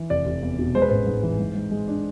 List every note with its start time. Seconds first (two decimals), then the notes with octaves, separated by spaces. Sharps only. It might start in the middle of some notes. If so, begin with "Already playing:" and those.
Already playing: E3
0.10 F1 D5
0.26 F1
0.42 E2
0.59 B2
0.74 G#3 C5
0.82 B4
0.89 A1 C5
1.07 G#2
1.23 E3
1.39 G#2
1.55 G#2
1.71 G#3
1.87 D4